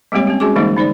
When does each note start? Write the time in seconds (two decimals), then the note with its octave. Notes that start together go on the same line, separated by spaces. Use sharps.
0.12 G3 G#3 A#3 C4 G4 C#5
0.27 C4 C#4 G4
0.40 G#3 C#4 F#4 G#4 D6
0.56 D3 E3 G3 G#3 A#3 D#4
0.76 D3 D#4 C5 D5